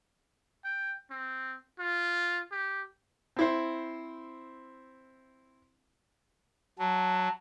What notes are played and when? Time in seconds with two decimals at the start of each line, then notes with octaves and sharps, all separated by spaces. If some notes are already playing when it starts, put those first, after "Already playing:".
0.64 G5
1.11 C4
1.79 F4
2.52 G4
3.37 C4 E4 C5
6.79 F#3 A5